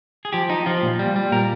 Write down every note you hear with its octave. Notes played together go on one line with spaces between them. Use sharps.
G#4
F3 G4
D#4
F3 F4
A#2
G3
G3
A#2 A#4